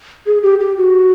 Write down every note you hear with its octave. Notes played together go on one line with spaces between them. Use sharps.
G#4
G4
G4
F#4